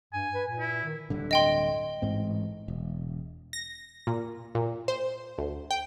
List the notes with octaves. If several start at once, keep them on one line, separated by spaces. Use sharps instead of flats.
G2 G#5
B4
A#2
E4
D#3
D1 G2 D3
D#5 G5 C6
A1 G#2 C4
E1
A#6
A#2
A#2
C5
D2
G5